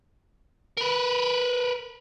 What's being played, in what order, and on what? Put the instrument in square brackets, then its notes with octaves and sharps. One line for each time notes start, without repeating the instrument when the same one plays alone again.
[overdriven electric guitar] A#4 B4